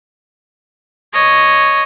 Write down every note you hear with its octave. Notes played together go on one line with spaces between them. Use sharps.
C#5 D#5